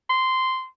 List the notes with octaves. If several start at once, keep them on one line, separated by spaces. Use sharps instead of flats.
C6